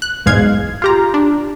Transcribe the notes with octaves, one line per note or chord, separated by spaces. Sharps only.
F#6
B1 E2 G#2 G#3 F5 G#6
F4 G4 A#5
D4